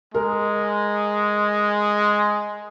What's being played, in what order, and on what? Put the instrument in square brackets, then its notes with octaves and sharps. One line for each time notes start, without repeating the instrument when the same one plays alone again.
[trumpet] G#3 [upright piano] A#4